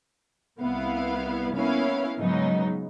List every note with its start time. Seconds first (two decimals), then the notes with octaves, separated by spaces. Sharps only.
0.60 C2 B3 E4 F5
1.55 A#3 B3 C#4 E4 C#5 F5
2.19 G#2 C#3 F#3 B3 D#4